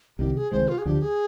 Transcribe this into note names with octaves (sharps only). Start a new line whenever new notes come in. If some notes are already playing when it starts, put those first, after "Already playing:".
C2 C3 D#3 G4
G#4
C2 C3 D#3 G#3 C5
F4
G#4
D2 D3 F3 G4
G#4